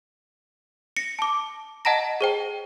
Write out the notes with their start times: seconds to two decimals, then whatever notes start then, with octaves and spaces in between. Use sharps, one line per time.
0.97 A#6 C#7
1.19 A5 D6
1.85 D#5 F#5 A5 A#5 A#6
2.21 G#4 C5 G5